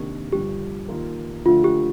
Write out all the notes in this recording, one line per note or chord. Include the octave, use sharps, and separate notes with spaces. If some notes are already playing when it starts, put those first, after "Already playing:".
Already playing: C3 D#3 A#3 D4 G4
G2 D3 F3 G4
D#3 A#3 F4
D3 F3 A3 D4 F4
G4